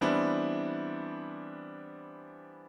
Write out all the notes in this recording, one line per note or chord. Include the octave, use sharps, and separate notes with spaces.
E3 G3 B3 C4 D4 E4